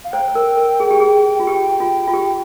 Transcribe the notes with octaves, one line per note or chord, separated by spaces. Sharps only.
F5
C5 G5
C5
A#4
A#4
G#4
G4
G#4
F4
G4
F4
F4
G4